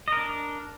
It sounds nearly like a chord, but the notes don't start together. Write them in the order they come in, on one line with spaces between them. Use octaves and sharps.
D#5 A#4 D4